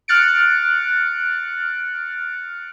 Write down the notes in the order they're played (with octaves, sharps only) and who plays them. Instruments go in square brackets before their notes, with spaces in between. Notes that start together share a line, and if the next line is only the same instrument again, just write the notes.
[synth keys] F6 F#6 A6 C#7 D7